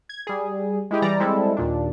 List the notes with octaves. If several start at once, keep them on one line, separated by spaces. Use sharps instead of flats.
G#6
G3 G#4
G#3 E4 G4 G#4
E3 G3 D5 A#5
G3 G#3 C4 E4 A4
D#2 A#2 D4